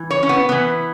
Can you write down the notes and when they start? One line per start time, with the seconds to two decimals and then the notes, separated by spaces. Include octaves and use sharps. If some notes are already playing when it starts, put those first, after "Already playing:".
Already playing: E3
0.11 C#5
0.23 C#4
0.29 B3
0.49 E3 B3